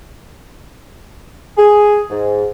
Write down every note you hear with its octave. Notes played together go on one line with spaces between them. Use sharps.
G#4
G#2